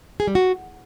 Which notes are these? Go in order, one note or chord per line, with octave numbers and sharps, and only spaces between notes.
G#4
G3
F#4